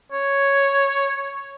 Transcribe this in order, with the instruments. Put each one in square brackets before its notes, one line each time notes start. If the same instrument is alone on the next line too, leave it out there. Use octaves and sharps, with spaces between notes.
[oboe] C#5